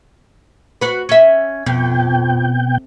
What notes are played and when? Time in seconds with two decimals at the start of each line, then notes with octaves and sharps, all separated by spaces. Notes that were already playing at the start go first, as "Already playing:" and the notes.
0.81 F#4 B4
1.09 C#4 E5
1.66 F2 B2 G5